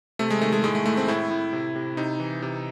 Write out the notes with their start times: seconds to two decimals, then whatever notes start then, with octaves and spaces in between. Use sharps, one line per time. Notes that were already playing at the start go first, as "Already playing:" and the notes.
0.19 C3 A3
0.30 G#3
0.41 D#3 A3
0.52 G#3
0.64 A2 G#3
0.75 A3
0.86 A2 A3
0.97 C4
1.08 A2 E4
1.31 A2
1.53 C3
1.76 C3
1.97 C3 D#4
2.20 E3
2.42 C3